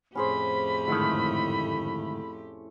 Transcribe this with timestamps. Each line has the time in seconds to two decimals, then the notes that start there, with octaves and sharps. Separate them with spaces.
0.15 F2 A2 C#4 G4 G#4 C5 B5
0.88 D2 G#2 D#3 A3 E4 A4